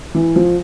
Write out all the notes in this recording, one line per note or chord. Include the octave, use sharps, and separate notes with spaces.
E3
F3